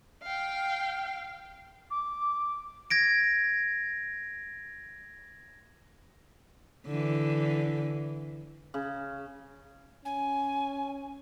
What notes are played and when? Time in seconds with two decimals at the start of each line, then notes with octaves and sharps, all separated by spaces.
0.22 F5 G5
1.91 D6
2.90 G#6 A#6 D7
6.87 D3 E3
8.74 C#3
10.05 C#4 G#5